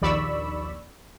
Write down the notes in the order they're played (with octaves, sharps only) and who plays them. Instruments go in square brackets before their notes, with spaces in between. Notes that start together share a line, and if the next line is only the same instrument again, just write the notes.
[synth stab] A#1 D#2 D5 B5 C#6 E6